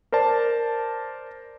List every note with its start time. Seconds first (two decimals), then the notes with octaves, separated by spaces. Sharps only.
0.12 A#4 C5 D5 A5